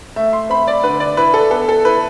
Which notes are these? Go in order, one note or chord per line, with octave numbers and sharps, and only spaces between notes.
A3 E5
C6
C4 B5
D5
D3 B4
D5
E4 B4
A4
B3 A4
A4
E4 B4